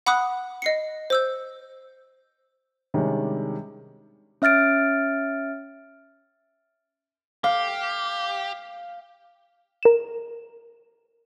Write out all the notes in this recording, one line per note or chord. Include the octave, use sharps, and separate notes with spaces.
F#5 B5 D6 D#6 F#6
D#5 C7 C#7
C5 E6 G6
C3 D#3 G3 G#3 C#4 D4
C#4 E5 F6 A6 D7
G4 F5
A#4 E7